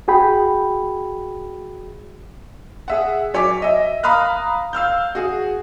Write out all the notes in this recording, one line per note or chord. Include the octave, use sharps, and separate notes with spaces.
F#4 G#4 G5 B5
G#4 E5 F#5
F#3 C#5 G#5 D6 B6
D#5 E5
F5 A#5 B5 D#6 F6 F#6
F5 E6 F6 G6
F#4 G#4